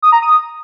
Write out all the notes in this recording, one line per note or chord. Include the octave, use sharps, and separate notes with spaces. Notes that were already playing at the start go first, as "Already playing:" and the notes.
D#6
A#5
D#6